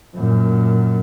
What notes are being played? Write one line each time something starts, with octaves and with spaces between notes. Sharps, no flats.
F#2 A#2